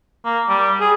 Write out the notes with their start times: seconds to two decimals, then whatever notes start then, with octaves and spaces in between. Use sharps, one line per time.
0.25 A#3
0.48 G3
0.80 G#4